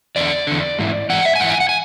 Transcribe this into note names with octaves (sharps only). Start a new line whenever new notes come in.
E2 D3 D5
E2 D3
G#2 E3
G#2 E3 F#5
E5
G#5
G#2 E3 F#5
G#5
F#5
G#5